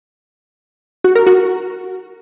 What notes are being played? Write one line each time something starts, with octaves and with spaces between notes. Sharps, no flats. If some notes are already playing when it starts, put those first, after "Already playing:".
F#4
A#4
F#4